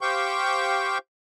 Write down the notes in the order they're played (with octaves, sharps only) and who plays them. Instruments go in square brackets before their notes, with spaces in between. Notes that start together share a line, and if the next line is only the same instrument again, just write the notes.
[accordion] G4 C5 F5 G5 C#6 G6